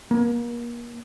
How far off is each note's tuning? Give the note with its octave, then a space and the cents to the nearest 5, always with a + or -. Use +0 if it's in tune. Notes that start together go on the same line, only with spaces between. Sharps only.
A#3 +35